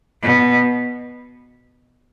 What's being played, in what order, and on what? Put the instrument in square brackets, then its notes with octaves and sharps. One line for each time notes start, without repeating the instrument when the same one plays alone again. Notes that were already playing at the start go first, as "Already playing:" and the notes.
[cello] B2